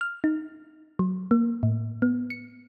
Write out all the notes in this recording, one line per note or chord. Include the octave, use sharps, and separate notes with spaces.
F6
D#4
F#3
A#3
A2
B3
C#7